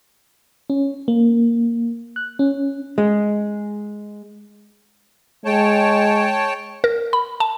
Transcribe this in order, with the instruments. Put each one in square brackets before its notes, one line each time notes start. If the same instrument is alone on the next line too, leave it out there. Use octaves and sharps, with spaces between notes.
[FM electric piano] C#4
A#3
F#6
C#4
[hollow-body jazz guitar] G#3
[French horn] G#3 [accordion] C#5 G5 A5
[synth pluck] A#4
B5
A5